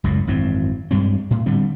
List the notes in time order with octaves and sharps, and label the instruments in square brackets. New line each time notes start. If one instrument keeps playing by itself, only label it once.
[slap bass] F#1 C#2 F#2 A2
G#1 F#2 E3 C4
G2 G3 G#3 C4
A2
D3 G3 B3 C4